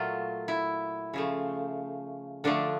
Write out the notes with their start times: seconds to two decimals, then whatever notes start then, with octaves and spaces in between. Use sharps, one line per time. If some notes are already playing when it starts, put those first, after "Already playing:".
Already playing: A#2 F#3 A3 F4
0.48 E4
1.13 C#3 F3 A3
2.44 D3 F3 A3 D4